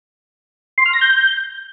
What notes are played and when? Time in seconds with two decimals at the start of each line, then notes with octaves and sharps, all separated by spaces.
0.78 C6
0.86 F6
0.93 A#6
1.01 G6